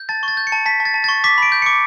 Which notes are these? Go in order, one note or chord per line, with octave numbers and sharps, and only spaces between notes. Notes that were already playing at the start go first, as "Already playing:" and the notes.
Already playing: G6
A5 A6
C#6
A6
G6
C#7
A5
A5 B6
A5
A6
A5
C#6 A6
D6 B6
B5 D7
G6
D6 C#7